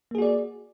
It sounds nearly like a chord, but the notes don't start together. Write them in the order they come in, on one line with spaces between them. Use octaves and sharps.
A#3 G#4 F#4 D5